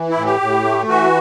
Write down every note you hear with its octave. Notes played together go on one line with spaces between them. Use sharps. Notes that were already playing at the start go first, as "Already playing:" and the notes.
Already playing: E3
E4
A2
G4
A2
A3
E3 F#4